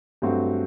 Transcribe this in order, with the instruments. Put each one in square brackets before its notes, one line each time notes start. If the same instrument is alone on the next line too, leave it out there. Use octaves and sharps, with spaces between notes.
[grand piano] G2 F#3 A3 C4 F#4